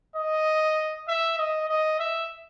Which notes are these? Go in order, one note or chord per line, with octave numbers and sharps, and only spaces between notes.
D#5
E5
D#5
D#5
E5